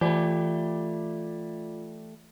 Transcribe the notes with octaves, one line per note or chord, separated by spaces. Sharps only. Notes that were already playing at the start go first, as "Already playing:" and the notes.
E3 A3 F4 G4 D5